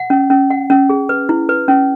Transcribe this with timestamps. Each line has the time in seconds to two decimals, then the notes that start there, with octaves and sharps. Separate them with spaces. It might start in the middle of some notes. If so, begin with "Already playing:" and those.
Already playing: F#5
0.10 C#4
0.30 C#4
0.50 F#5
0.70 C#4
0.90 G#4
1.09 B4
1.29 E4
1.49 B4
1.68 C#4